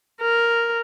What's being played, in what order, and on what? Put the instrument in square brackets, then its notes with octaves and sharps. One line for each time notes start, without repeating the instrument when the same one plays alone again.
[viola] A#4